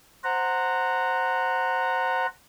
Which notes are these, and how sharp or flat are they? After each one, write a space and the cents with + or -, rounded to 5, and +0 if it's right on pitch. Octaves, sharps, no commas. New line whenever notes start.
C5 +0 F#5 +0 A#5 -15